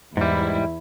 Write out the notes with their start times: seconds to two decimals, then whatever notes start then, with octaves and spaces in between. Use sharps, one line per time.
0.17 E2 G#2 G3 E4